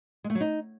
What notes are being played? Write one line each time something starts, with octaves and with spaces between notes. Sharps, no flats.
G#3
A3
F#3
D#4